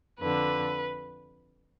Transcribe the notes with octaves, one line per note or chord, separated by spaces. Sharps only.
F2 D3 B4